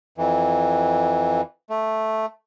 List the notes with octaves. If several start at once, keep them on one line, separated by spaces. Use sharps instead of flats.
F2 E3
A3